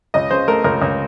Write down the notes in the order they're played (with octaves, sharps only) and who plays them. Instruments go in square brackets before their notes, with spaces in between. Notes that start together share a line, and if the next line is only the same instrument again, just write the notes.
[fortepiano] C#2 D#5
C#3 C5
A3 A#4
C#2 A#4
C#2